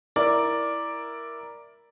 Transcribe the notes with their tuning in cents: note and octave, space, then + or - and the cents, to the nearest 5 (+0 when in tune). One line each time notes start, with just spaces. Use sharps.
E4 +0 A#4 +5 D5 +0